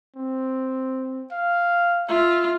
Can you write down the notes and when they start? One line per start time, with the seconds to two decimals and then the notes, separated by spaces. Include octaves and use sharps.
0.16 C4
1.32 F5
2.09 F4 E5